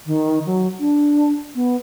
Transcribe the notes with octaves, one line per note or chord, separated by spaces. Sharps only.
D#3
F#3
D4
B3